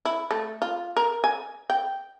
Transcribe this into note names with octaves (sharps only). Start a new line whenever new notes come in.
E4
A3
F4
A#4
G#5
G5